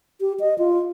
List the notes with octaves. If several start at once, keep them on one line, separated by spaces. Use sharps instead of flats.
G4
D#5
F4